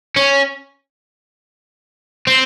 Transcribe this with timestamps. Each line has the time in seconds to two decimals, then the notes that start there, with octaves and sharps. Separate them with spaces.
0.16 C#4
2.27 C4